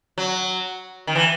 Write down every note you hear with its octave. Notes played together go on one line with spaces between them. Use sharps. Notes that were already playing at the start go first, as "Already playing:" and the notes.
F#3
D#3
E3